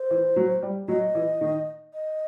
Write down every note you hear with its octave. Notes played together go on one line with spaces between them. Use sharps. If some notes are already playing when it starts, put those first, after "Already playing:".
Already playing: C5
E3
F#3
G3
F#3 D#5
E3
D#3
D#5